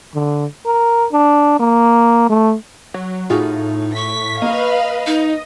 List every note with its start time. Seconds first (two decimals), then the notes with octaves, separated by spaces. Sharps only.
0.15 D3
0.66 A#4
1.12 D4
1.60 A#3
2.30 A3
2.94 F#3
3.30 A2 D#4 F4 F#4 G#4
3.96 C#6 B6
4.42 A#3 B4 D#5 F5
5.06 D#4